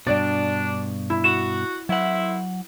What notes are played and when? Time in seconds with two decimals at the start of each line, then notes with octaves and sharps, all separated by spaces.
0.07 G2 B2 D4 D5
1.10 E4
1.24 F#4 E7
1.89 A2 F#3 C4 E4 F#5